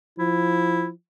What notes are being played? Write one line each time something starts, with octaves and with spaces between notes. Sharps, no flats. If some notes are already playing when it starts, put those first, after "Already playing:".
F3 E4